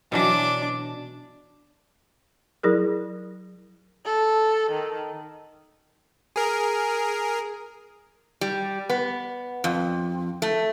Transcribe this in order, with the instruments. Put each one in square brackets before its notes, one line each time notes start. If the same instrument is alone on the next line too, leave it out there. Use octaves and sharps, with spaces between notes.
[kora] B2 E3 F#3 [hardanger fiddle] D4 D6
[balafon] F#3 E4 G#4 A#4
[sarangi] A4
D#3
[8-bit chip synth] G#4 A#4
[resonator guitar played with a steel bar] G3
B3
F2
A3